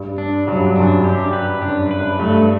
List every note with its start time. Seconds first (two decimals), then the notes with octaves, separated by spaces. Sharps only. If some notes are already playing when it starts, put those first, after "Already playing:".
Already playing: G2
0.18 D4
0.47 G2 F#3
0.57 F#2
0.76 F#2 D4
1.04 G4
1.33 B4
1.62 F#2 D4
1.80 G2
1.91 B4
2.00 F#2
2.19 G2 A3